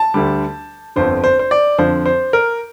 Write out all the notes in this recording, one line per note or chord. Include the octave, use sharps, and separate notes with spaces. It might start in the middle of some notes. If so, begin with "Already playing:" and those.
Already playing: A5
D2 D3 G3
G1 F2 D3 C5
C5
C5
D5
F2 D3 F3 C5
C5
A#4